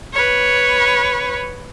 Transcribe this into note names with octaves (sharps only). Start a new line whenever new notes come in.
B4 C#5